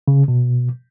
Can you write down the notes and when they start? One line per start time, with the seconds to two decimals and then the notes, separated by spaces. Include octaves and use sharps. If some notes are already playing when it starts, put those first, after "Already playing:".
0.08 C#3
0.28 B2